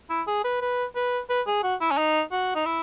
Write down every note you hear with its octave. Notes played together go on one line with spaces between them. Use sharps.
E4
G#4
B4
B4
B4
B4
G#4
F#4
E4
C#4
D#4
F#4
D#4
E4